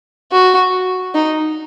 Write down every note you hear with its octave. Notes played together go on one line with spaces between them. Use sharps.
F#4
D#4